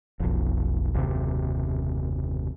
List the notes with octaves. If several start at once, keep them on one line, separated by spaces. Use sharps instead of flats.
F1 B1
F#1 D#2 C3